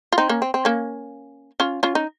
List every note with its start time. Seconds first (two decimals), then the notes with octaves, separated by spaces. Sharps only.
0.12 F4
0.18 C4 D#4
0.29 A#3 C#4
0.42 C4
0.54 C4
0.65 A#3 C#4
1.60 C#4 F4
1.83 C#4 F4
1.95 D#4